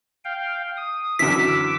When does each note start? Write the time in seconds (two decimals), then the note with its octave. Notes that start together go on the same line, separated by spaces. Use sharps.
0.25 F5 G5
0.77 D#6
1.19 F#2 D3 E3 D6 E6 B6